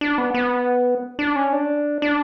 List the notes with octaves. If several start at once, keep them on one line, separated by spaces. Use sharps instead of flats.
D4
B3
B3
D4
C#4
D4
D4